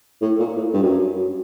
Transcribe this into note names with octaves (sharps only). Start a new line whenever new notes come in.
A2
A#2
A2
G2
F#2